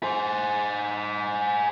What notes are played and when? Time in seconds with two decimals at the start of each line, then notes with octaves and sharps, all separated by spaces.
0.03 G#4 C5